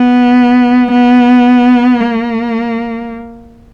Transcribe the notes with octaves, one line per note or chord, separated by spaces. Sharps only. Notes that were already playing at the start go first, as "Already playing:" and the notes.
Already playing: B3
B3
A#3